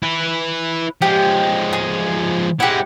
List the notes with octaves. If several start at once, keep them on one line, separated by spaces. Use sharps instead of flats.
E4 B4
F3 G#3 G4
G#4
G#3 E4 G4 F#5